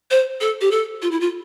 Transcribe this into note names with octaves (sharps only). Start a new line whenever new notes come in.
C5
A4
G4
A4
F4
E4
F4